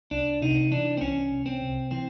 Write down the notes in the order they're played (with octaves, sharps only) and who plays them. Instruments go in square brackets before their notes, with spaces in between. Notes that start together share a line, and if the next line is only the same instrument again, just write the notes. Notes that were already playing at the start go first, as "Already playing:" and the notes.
[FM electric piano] C2 [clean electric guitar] D4
[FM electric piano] C3 [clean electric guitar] D#4
[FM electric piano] E3 [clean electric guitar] D4
[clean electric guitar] C4
[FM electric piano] C2 [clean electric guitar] C#4
[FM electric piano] C2
[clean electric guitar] C4
[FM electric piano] C3
[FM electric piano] E3 [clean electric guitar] C4